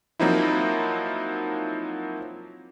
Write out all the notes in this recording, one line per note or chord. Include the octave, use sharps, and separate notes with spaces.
F3 F#3 A#3 C4 D#4 E4